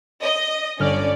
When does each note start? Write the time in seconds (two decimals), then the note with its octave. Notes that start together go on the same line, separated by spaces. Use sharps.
0.22 D#5
0.79 G1 C#4 D5 F6